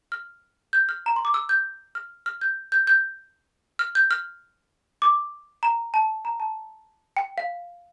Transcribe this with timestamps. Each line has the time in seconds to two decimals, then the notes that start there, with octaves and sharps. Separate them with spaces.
0.12 F6
0.73 G6
0.89 F6
1.06 A#5
1.16 C6
1.25 D6
1.34 E6
1.49 G6
1.95 F6
2.26 F6
2.41 G6
2.72 G6
2.87 G6
3.79 F6
3.95 G6
4.11 F6
5.02 D6
5.63 A#5
5.94 A5
6.25 A#5
6.40 A5
7.17 G5
7.38 F5